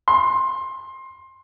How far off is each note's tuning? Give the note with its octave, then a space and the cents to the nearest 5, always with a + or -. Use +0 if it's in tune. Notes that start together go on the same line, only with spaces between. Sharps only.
C6 +20